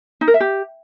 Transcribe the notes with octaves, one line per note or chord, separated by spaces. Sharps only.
D#4
A#4
E5
G4